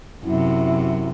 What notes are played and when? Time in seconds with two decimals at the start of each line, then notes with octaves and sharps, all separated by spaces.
0.24 F#2 C3 E4